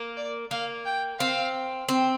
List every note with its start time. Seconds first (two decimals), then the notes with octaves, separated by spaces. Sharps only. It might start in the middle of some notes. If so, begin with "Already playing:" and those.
Already playing: A#3
0.17 D5
0.51 A#3 F5
0.85 G5
1.19 C4 F5
1.89 C4